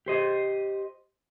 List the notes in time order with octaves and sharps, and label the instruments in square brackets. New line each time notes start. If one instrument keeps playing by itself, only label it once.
[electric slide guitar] G4 C5 D#5